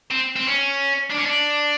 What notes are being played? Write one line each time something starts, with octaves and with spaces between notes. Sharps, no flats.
C4
C4
C#4
D4
C#4
D4